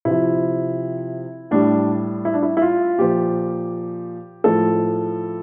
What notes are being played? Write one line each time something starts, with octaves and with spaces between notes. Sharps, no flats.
C3 F3 E4
A2 G3 D4
E4
D4
E4
E4
F4
A#2 F3 G4
A2 F3 A4